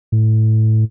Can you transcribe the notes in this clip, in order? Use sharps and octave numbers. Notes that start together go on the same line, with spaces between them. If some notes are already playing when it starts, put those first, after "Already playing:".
A2